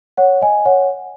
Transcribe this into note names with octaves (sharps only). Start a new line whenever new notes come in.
C#5 F#5
D#5 G#5
C#5 F#5